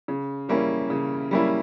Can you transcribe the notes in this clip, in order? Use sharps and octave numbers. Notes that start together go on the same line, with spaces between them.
C#3
G3 A#3 C#4 E4
C#3
G3 A#3 C#4 E4